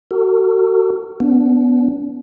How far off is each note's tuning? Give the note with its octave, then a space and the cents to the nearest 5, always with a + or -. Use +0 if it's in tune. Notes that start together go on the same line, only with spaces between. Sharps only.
F#4 +30 A4 +45
B3 +5 D4 -40